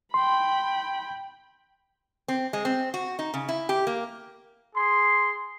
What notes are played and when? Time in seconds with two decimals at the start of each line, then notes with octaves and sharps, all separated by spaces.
0.14 G5 B5 C6
2.28 C4
2.53 G#3
2.65 C4
2.94 F#4
3.19 D#4
3.34 C#3
3.49 E4
3.69 G4
3.87 A#3
4.74 G#4 C6